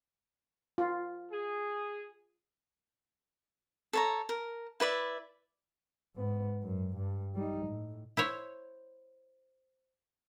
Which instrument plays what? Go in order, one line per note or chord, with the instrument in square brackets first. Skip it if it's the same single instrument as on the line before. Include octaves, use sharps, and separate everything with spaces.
[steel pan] F4
[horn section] G#4
[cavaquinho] A4 C#5 A#5
A#4
E4 B4 D5 E5
[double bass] G#2 B3
F#2
G2
G3 D#4
A2
[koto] E4 C5 C#5